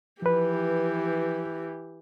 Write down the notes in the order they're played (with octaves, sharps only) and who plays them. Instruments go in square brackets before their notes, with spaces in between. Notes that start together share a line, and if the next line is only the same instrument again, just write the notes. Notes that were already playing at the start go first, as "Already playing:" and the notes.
[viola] E3 G4 [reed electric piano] F3 B4